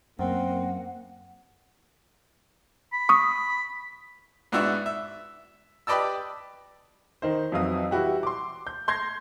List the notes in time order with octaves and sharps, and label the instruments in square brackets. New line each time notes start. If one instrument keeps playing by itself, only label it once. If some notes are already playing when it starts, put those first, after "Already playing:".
[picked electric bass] F#2 [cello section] A#3 [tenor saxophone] C4 [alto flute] F#5
[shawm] B5
[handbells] C#6 D#6
[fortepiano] G#2 B3 D4 E4 F#4 E5
E5
G4 B4 D5 D#5 A5 E6
[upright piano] D#3 D#4 C5
F2 E3 F#3 F5 D#6
E3 G3 E4 F#4 G4
C6 D6
G6
C6 G6 G#6 A#6 C7